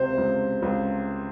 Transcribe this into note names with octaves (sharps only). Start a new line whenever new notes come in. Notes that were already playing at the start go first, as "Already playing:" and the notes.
Already playing: C#2 C3 C5
C#2
C#2